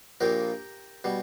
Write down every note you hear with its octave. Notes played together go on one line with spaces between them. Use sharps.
A#1 A#2 A#3 G4 A#4
B2 G3